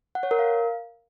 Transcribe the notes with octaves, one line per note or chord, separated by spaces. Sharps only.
F#5
C#5
A#4
F5